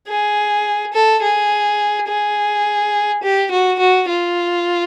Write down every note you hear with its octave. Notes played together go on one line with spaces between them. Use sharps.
G#4
A4
G#4
G#4
G4
F#4
F#4
F4